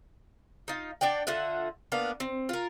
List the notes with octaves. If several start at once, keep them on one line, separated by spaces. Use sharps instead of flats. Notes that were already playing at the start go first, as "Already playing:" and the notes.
D#4 F4
D4 D5 F#5 G5
D3 F4 E5 F#5
A#3 B3 D4 F5
C4
F4 A#4